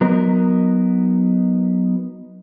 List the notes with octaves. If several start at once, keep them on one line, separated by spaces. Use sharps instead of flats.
F#3 B3 D#4 A#4